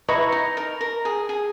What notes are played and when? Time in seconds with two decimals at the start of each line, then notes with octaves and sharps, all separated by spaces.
0.08 E4 B4 D#5 A#5 C#6
0.32 D#4
0.57 A#4
0.81 A#4
1.05 G#4
1.29 G#4